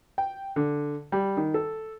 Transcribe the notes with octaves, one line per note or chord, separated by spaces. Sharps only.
G5
D3
G3
D#3
A4